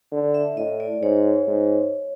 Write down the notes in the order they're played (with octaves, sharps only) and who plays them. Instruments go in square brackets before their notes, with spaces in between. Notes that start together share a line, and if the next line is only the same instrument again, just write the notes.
[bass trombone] D3
[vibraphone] E5
[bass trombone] A2 [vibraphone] D#5
[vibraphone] D5
[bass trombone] G#2 [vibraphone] C#5
[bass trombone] G#2